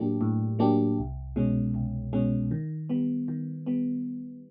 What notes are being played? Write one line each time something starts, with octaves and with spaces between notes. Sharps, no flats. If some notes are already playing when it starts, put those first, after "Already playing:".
Already playing: A2 F#3 A#3 D4 G4
A2
F#3 A#3 D4 G4
C2
B2 G#3 C#4
C2
B2 G#3 C#4
D#3
G3 B3
D#3
G3 B3